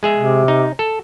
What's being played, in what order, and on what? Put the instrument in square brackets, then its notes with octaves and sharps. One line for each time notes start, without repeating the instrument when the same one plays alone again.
[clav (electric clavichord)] G#3 G#4 E5
[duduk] C3
[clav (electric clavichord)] D#4
A4